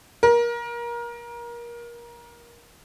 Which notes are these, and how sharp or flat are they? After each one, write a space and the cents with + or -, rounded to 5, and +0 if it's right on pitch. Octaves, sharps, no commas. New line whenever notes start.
A#4 +25